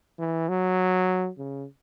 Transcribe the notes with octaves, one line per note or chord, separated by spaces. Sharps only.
E3
F#3
C#3